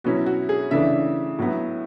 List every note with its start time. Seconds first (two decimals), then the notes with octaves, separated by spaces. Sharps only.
0.04 B2 F#3 C#4 E4 F#4
0.26 F#4
0.49 G#4
0.71 C#3 E3 A3 D4 E5
1.39 A2 F#3 B3